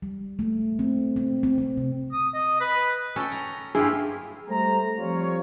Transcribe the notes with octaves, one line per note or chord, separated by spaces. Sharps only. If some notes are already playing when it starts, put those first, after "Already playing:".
G3
A3
C4
C4
C4
C4
C3
D#6
D#5
B4
C#4 A4 G5
A#5
G2 E4 F4 G4 G#4
G3 A3 C5 A#5
F3 G3 C4 F4 C#5